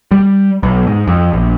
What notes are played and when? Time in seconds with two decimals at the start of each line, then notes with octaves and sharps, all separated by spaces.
0.11 G3
0.63 B1
0.87 G#2
1.07 F2
1.33 A#1